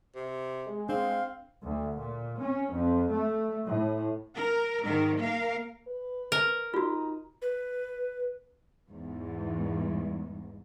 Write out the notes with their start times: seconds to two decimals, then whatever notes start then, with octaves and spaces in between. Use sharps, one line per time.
0.15 C3
0.66 G#3
0.89 C4 D4 F5
1.63 D2
1.97 A#2
2.39 C#4
2.72 F2
3.11 A3
3.65 A2
4.34 A#4
4.84 G#2 D#3 A#4
5.17 A#3 A#4 F5
5.87 B4
6.32 A#4
6.74 D#4 F4 F#4
7.42 B4
8.88 E2 G#2